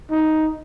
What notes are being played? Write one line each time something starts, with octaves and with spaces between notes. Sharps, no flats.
D#4